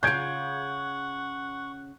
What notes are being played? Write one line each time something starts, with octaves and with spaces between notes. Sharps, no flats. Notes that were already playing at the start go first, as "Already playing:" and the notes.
C#3 F4 F#5 C#6 G6 G#6 D7